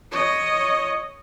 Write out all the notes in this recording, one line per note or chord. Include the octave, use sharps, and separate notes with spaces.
C#5 D#5